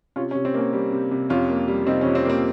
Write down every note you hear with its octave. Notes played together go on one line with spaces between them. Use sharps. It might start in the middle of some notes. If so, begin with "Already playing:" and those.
C3 C#4 F4
C#4
C3
C4
A#3 C#4
G3
C3
C3
F2 C#4 F4
A#3
G3
C3 C4 D#4
C#4
F2
C4
A#3 C4